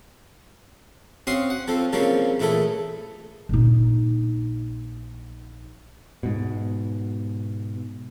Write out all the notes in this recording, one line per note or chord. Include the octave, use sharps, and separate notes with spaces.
C4 C#4 F#4 F5 C6 D#6
F#5
F3 C4 A4
C#3 F3 G3 A#3 C4 C#4
A#2 E3 A3 E4 G#4 A4
A#1 D#4
G#2 B2